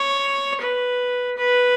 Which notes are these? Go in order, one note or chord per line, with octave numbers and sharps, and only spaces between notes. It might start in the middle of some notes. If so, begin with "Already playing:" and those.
Already playing: C#5
B4
B4